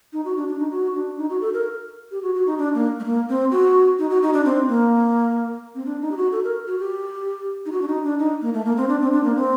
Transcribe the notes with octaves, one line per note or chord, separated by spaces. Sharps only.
D#4
F#4
D4
D4
D#4
F#4
D4
D#4
F#4
A4
A#4
G4
F#4
F#4
D#4
D4
A#3
A3
A#3
C4
F#4
D#4
F#4
D#4
D4
C4
A#3
C4
D4
D#4
G4
F#4
A4
A#4
F#4
G4
D#4
F#4
D4
D#4
D4
D#4
A#3
A3
A#3
C4
D4
C4
D4
A#3
C4